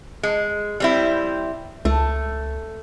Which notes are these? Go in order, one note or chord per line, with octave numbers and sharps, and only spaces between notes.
G#3
G3 C4 E4
C#2 A3